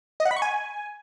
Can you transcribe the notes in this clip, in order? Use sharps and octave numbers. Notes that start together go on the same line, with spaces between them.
D#5
F#5
B5
C#6
G#5